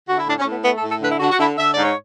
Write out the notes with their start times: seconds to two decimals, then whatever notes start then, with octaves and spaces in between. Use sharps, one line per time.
0.08 D3 F#4
0.17 E4
0.26 A2 D4
0.39 C#4
0.45 A2
0.52 B3
0.63 A3 B3
0.77 A4
0.83 A2
0.89 A4
1.01 D3 B4
1.10 E4
1.20 D3 F#4
1.30 F#4
1.39 D3 E4
1.57 D3 E5
1.70 D5
1.76 G#2
1.82 C#5